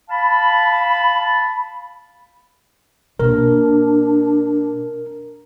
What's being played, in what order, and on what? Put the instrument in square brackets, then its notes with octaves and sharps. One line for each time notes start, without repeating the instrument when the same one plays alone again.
[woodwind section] F5 A5 B5
[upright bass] B2 A#3 [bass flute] D4 [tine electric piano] A#4